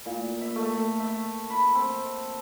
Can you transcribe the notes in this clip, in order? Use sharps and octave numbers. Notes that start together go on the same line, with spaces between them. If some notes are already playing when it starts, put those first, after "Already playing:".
A#2
E5
A3
E5
B5
C4